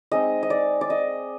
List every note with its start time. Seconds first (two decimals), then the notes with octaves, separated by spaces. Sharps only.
0.11 G#3 C4 D#4 D#5
0.43 D#5
0.50 D5
0.81 D5
0.90 D#5